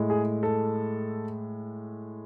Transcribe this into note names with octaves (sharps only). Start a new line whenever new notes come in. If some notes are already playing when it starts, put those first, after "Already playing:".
Already playing: A2 G#3
G#4
A4